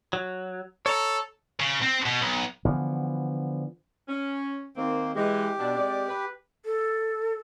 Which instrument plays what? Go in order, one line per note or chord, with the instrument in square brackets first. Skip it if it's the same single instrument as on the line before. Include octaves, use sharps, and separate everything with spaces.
[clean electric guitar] F#3
[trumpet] A4 [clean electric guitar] C#5 A#5
[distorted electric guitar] C#3
C4
B2
B1
[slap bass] D3 E3 F3 B3
[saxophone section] C#4
[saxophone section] D#2 D#3 C4 [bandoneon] A#3
[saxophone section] E3 G#3 [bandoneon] G4
[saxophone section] B2 D4
C3 G#3 D5
B4
[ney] A4